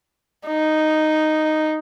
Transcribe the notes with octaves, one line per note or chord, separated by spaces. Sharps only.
D#4